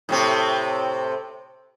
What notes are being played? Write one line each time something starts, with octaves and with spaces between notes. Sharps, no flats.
A2 C3 C4